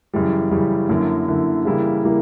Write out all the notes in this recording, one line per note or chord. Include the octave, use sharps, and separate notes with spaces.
F#2 C#3 E3 G3
F#2 C#3 E3 G3
F#2 D3 A#3 E4
F#2 D3 A#3 E4
C#3 E3 G3 A#3 E4
C#3 E3 G3 A#3 E4